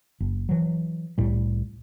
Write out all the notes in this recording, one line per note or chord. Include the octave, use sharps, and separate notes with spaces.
F#1
E3 F#3
C2 A2 G3